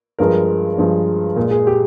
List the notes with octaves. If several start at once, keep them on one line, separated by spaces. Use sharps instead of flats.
G2 F3 G#3 A#4
G2 F3 G#3
A#2 G#3
G#4
G4